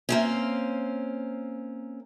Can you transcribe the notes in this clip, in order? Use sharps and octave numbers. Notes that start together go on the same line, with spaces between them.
A#3 C4 C#4